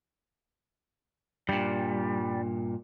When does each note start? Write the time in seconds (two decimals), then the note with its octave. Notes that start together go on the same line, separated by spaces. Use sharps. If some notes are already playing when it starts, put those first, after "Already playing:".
1.49 G2 A#2 G3